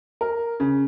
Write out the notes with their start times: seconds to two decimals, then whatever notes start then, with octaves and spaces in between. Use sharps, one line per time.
0.21 A#4
0.60 C#3